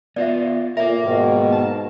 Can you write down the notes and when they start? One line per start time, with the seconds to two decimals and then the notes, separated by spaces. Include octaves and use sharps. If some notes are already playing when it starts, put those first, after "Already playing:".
0.16 B3 F4 D5 E5
0.77 A#2 A#3 A4 A#4 C#5 E5
1.01 G#2 B2 D#3
1.52 A5